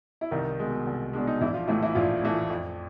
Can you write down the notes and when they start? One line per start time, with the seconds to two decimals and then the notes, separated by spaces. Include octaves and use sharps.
0.21 E4
0.31 C2 D#3 D#4
0.59 B2 G#3
0.87 C2
1.13 B2 G#3 D4
1.27 D#4
1.41 A#1 E3 E4
1.54 F3 F4
1.68 A2 E3 A3 E4
1.82 E3 E4
1.95 A#1 F3 F4
2.23 A2 E3 A3
2.50 F2